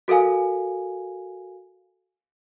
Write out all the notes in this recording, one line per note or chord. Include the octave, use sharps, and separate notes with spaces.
F#4 A4 A#4 F5 G#5